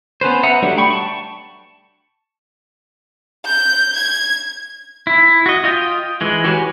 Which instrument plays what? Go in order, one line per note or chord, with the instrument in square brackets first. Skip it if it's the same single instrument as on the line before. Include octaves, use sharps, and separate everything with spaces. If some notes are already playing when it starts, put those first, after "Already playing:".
[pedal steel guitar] B3 C#4 B4 C5
B4 E5 F#5 A#5 D#6
F#3 G3 A3 D4
G5 B5 C#6
A5 C#6
[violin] G6
G#6
[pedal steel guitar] E4
F#4 D#5
F4 D#5 G5 D#6
E3 G#3
F#4 G4 B4 C#5 G#5